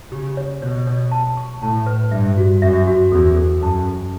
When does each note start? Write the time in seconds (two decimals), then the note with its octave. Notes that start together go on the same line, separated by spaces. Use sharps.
0.11 C#3 G4
0.37 C#5
0.61 B2 C#5
0.87 C#5
1.11 A5
1.37 C#6
1.62 A2 A5
1.87 B4
2.11 G2 E5
2.37 F#4
2.62 F#2 E5
2.86 F#4
3.11 E2 A4
3.36 A4
3.62 F#2 A5
3.87 A4